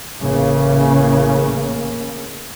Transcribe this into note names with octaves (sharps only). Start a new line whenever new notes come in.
A1 C#3 A#3 C#4